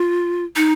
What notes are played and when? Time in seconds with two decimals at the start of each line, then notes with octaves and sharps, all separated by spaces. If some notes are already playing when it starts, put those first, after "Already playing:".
Already playing: F4
0.56 D#4